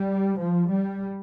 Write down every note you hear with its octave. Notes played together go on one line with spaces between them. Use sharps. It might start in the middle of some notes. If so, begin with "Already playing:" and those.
Already playing: G3
F3
G3